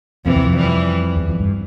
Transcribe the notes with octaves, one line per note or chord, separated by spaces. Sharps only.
F2 C3 E3
E2
F2
E3 G3
E2
F2
G2